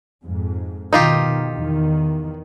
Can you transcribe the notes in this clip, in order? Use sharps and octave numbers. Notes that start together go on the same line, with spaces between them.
F2 G#2
B2 D#3 D#4 F4 G4
E2 D#3